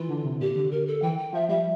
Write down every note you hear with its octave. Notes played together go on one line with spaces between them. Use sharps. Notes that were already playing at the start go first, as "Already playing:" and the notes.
Already playing: E3 F4
D3
C3
A#2 G4
D3
A#4
A4
E3 G5
G5
F3 E5
G3 E5